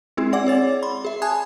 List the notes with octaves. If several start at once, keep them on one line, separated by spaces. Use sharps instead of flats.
G#3 C4 E4 G#4
C4 D5 F#5 D6
G#4 C#5 A6
B5 C6
G#4 E5
G#5 A5 D#6 F#6 G#6